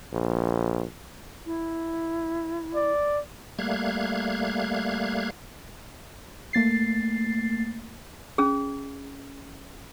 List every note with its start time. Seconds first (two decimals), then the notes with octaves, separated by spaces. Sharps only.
0.13 A#1
1.46 E4
2.75 D5
3.59 G3 A3 A#3 F5 F#6 G#6
6.53 A3 A#3 A6 C7
8.38 C#4 G#4